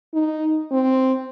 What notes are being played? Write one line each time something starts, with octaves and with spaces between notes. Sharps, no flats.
D#4
C4